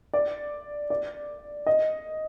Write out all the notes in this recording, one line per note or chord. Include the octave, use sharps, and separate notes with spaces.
D5
D5
D#5